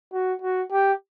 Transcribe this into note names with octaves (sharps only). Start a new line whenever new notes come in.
F#4
F#4
G4